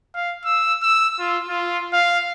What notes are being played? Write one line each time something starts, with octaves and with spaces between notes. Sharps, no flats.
F5
E6
E6
F4
F4
F5